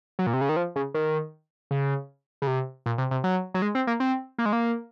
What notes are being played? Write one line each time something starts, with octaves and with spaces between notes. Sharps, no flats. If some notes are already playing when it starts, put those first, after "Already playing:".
F#3
A#2
C3
C#3
D#3
F3
C#3
D#3
C#3
C#3
C3
A#2
C3
C3
F#3
F#3
G#3
C4
A#3
C4
A#3
G#3
A#3